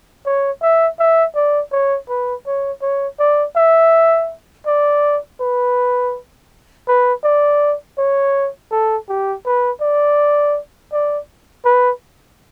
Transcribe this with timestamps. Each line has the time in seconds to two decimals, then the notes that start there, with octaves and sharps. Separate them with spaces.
0.26 C#5
0.62 E5
0.99 E5
1.35 D5
1.72 C#5
2.09 B4
2.46 C#5
2.82 C#5
3.20 D5
3.56 E5
4.67 D5
5.40 B4
6.88 B4
7.24 D5
7.98 C#5
8.71 A4
9.09 G4
9.46 B4
9.81 D5
10.92 D5
11.65 B4